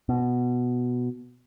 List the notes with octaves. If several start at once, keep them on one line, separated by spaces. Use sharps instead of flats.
B2